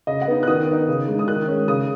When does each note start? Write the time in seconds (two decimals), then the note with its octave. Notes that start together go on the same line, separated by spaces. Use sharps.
0.07 C#3 D#5
0.21 F#5
0.28 B3 D#4
0.43 F#6
0.47 D#3 D#6
0.67 B3 D#4
0.88 C#3
1.08 G#3 D#4
1.19 D#6
1.28 D#3 F#6
1.48 G#3 C#4
1.68 C#3 D#6